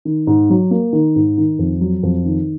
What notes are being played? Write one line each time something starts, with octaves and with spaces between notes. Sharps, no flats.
D#3
G#2
F#3
A#3
D#3
G#2
D#3
F2
F#3
F2
D#3